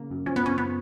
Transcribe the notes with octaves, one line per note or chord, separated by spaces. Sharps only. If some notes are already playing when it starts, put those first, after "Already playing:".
Already playing: C#3 A#3
F#2
F3 C#4
B3
F3 C#4
B3